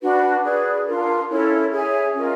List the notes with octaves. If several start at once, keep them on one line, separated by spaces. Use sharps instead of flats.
D4 F#4 B4
G#4 B4 D5
D4 F4 A#4
C#4 E4 A4 C#5
G#4 C#5 E5 G#5
C#4 F4 A#4 D#5